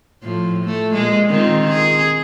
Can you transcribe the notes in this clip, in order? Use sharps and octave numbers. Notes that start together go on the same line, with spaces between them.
A2 F3
A3
A#2 G#3
D#3 C4 F4
G#4